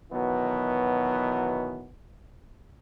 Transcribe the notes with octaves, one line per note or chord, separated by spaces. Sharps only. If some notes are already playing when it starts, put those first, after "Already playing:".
B2 D#3 E3 F#3 B3